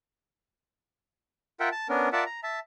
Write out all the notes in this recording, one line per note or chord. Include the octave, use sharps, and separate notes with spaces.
F4 A#4 E5 F#5 G5
A5
B3 C#4 D4 A#4
F4 A#4 D5 E5 F#5 A5
A#5
E5 A5